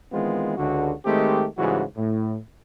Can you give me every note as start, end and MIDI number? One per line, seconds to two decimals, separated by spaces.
0.12 0.57 51
0.12 0.57 52
0.12 0.57 56
0.12 0.57 59
0.12 0.57 60
0.12 0.57 65
0.57 0.93 37
0.57 0.93 50
0.57 0.93 66
1.06 1.46 51
1.06 1.46 56
1.06 1.46 57
1.06 1.46 60
1.06 1.46 67
1.58 1.82 44
1.58 1.82 49
1.58 1.82 52
1.58 1.82 55
1.58 1.82 66
1.97 2.37 45